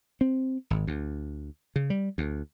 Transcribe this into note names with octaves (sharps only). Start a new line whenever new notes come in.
C4
G#1
D2
C#3
G3
D2